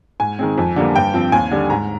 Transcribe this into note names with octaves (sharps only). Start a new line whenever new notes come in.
G#2 G#5
D#3 G#3 C4
F2
D3 G3 A#3
G2 G5
F3 C4
D#2 G#5
D3 G3
G#2 A#5